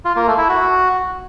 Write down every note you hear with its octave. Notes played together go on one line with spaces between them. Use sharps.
F4
A#3
A3
E4
F#4